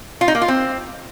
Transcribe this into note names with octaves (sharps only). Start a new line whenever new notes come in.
F4
D#4
A#3
F4
C4